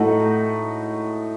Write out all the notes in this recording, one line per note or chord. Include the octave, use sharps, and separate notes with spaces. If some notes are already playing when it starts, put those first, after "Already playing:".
Already playing: A2 A3 D#4 F#4